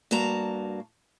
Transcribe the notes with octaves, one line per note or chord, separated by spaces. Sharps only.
G2 A#3 F#4 A5 A#5